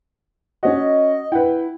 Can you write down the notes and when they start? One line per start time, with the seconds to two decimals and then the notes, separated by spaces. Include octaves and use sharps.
0.63 C#4 F#4 D#5
1.32 E4 B4 F#5 G5